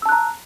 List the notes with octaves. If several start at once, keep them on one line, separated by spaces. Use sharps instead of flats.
A5 A#5 E6 F#6